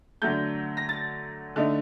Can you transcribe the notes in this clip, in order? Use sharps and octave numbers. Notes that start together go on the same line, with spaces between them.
D3 F#3 A3 G6
A#6
A6
D3 A3 D#4